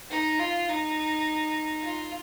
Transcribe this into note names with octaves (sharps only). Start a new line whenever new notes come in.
D#4
F4
D#4
F4